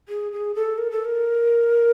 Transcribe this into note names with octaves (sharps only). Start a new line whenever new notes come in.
G#4
G#4
A4
A#4
A4
A#4